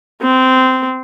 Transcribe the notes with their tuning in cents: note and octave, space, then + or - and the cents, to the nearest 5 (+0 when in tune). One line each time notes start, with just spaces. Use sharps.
C4 -15